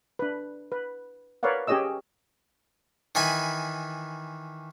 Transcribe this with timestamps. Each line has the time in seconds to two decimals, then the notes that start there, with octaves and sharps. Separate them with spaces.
0.19 D4 B4
0.72 B4
1.43 A#4 B4 C#5 D5 F5 F#5
1.67 C#4 G4 G#4 C#5 D#5 E6
3.15 D#3 E3 G#5 B5